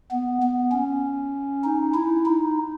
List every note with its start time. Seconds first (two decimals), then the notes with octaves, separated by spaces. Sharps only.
0.11 B3
0.42 B3
0.72 C#4
1.64 D#4
1.94 E4
2.26 D#4